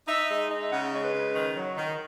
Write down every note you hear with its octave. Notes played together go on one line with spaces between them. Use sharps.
D#4 E5
G#3
D#4
E5
C#3 F#5
G#3 C#5
B4
C#3
D#3
F#3
D#3